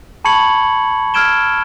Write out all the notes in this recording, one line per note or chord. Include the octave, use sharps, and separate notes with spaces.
A5 B5 C#6 G#6 C#7 F#7
E6 F6 G#6 D7 E7 G7